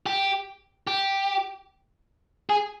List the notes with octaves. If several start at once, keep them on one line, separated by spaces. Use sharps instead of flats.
G4
G4
G#4